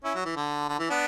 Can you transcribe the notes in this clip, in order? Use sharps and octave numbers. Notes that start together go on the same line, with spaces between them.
C#4 E4
F#3
E3
D3
D3
E3
B3 D4